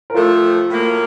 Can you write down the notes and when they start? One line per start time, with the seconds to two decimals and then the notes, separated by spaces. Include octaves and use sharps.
0.10 A#4
0.14 C3 F3 A3 F4 A4
0.69 A2 F#3 A#3